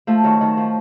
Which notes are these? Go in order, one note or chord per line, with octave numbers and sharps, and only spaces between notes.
F3 A3
D#3 F#3
D#3
F3